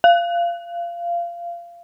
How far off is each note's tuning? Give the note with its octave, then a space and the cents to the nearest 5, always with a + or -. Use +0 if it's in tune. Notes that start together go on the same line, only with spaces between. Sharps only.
F5 -20